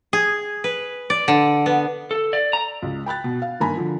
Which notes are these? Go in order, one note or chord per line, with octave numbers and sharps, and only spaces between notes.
G#4
B4
D5
D3
B3
A4
D5
A#5
C#2
G5 B5 F#6 A6
B2
F5
G1 D#3 A#3 G#5 A#5 B5
D3 F3